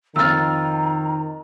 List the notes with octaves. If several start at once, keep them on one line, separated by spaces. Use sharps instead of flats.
F2 D#3 A#5 E6 F6 A6